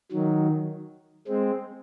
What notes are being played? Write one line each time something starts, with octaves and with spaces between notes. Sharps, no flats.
D#3 F#3
G#3 C4